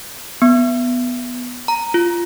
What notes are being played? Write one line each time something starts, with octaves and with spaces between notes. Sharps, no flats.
B3
A#5
F4